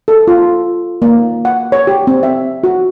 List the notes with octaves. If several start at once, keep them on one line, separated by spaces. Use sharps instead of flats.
A4
F4
A#3
F#5
C#5
G4
C4
E5
F#4